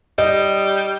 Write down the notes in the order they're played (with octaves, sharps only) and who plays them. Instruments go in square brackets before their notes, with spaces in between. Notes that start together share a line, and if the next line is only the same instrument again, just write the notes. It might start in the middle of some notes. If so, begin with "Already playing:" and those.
[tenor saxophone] G3 [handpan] D#5